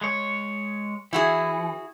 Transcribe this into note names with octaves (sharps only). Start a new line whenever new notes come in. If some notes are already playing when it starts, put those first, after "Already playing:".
G#3 C#5
E3 E4 F#4 G#4